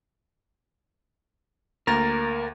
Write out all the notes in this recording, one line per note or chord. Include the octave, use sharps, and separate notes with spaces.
D2 A#3 A#4 A6